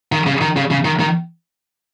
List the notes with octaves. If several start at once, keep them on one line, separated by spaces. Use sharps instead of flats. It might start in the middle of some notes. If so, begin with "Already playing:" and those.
D#3
C#3
D#3
C#3
C#3
D#3
D#3